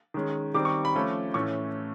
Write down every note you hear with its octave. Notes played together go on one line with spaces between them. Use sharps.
D#3 G#3 C#4
D#3 G3 C4 D6
C#6
B5
F3 A3 C#4
A2 E3 A3 C#4 C#6